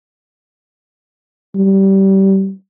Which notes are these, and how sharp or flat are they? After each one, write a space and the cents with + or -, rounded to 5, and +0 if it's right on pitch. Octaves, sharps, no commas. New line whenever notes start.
G3 -20